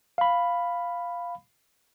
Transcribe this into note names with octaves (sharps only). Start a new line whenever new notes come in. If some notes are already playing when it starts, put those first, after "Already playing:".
F5 B5